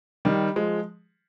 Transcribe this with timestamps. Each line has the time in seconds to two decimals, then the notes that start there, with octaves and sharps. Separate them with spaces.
0.25 D#3 G3
0.56 F3 G#3